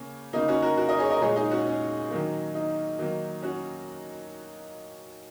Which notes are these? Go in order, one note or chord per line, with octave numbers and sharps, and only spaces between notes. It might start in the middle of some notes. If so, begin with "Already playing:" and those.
Already playing: C#3 A#3 C#4
C#3 A#3 D#4
C#4 F#4
F#4 A#4
F#4 A#4
A#4 D#5
G#4 C#5
A#4 D#5
A#2 G#3 G#4 C#5
D#4 G#4
C#4 F#4
C#4
D#3 F#3 A#3
D#4
D#3 F#3 A#3
C#4 F#4